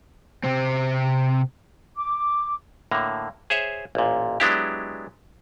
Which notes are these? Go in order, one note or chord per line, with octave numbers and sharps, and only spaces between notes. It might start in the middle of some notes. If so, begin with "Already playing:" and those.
C3 C4
D6
A2 D3 A#3
G#4 C5 C#5 E5
A1 A#2
F#3 G#3 B3 D4 E4 G4